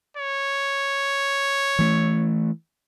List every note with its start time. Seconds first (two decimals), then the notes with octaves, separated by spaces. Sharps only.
0.17 C#5
1.79 E3 A3